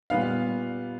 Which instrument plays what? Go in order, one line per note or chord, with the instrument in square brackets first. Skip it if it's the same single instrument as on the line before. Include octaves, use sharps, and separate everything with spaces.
[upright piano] A#2 G3 B3 F5